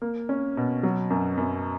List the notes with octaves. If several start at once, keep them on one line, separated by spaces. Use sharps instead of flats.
A#3
C#4
B2
F#3
F#2
F#2